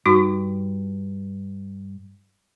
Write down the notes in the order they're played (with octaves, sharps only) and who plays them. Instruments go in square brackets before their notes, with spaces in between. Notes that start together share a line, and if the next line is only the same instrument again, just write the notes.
[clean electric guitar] G2 [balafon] D#4 F#4 C#6